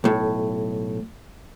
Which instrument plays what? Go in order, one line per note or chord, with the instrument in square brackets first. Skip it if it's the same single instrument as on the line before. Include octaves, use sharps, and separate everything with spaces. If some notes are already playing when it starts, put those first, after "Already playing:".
[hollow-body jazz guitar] B1 A2